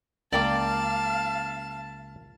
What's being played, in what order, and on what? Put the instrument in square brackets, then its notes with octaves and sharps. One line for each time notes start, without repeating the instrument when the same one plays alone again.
[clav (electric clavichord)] C#2 A#3 [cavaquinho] D5 G5 D6 [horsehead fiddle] F5 [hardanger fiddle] A5